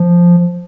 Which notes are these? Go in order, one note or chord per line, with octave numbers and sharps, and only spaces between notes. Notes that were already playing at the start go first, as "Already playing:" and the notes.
Already playing: F3